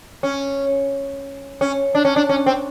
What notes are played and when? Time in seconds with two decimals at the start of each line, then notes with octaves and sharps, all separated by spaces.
0.23 C#4
1.61 C#4
1.95 D4
2.05 C#4
2.16 D4
2.29 C#4
2.46 C4